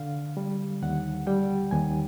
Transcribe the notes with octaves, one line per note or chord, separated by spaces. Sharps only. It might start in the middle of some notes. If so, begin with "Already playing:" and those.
Already playing: D3 F5
G3
D#2 F#5
G3 G5
D#2 G#5